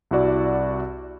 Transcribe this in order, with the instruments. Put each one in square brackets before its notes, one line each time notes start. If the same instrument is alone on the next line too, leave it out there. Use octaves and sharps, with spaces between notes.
[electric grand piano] C2 E4 F#4 D5